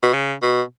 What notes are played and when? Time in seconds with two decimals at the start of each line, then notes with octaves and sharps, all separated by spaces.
0.02 B2
0.13 C#3
0.42 B2